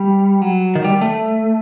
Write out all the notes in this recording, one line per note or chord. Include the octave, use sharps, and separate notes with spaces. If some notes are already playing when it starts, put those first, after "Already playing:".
Already playing: G3
F#3
D#3
G3
A3